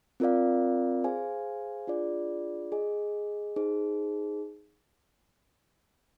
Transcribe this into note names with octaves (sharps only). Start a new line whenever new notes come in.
C4 F4 A#4 D5 F5
G#4 C5 F5 G#5
D4 F4 G#4 D5
G#4 D#5 G#5
D#4 G#4 C5